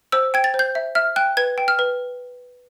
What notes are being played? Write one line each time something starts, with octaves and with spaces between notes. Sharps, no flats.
C5 E6
G5 G#6
A6
C5
G6
E5
E5 F6
G5 F#6
B4 G#6
G5
F6
B4